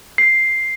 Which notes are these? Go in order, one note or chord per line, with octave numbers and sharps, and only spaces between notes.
C7